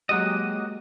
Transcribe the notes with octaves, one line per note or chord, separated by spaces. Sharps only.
F#3 G#3 A#3 F#4 G4 D#5